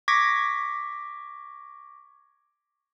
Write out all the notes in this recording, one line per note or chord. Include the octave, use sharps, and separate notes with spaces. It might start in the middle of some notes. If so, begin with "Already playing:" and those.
C#6 D6 G#6 A#6 B6 D7